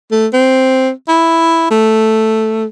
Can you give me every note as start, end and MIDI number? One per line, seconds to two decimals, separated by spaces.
0.12 0.27 57
0.33 0.90 60
1.09 1.67 64
1.71 2.66 57